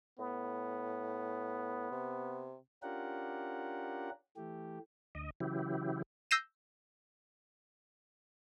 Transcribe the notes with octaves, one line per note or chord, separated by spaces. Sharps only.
A2 B3
C3
C#4 D4 F4 G4 A#4 F#5
E3 A3 G4
D2 D#5
C#3 E3 F#3 E4 G4
E6 G6 A#6 C7 D#7 E7